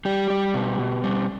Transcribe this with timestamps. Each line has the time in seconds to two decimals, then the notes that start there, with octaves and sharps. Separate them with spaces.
0.05 G3 G4
0.30 G3
0.54 B2
0.79 B2
1.04 G3